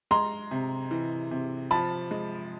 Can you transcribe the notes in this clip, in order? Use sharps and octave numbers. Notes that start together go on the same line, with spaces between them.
G#3 A#5 C6
C3
E3
C3
F3 A5 B5
G#3